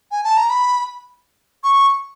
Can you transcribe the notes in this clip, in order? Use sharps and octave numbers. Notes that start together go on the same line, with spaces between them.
G#5
A5
A#5
B5
C#6